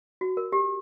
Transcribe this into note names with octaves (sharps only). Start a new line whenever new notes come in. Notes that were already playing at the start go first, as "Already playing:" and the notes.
F#4
A#4
G4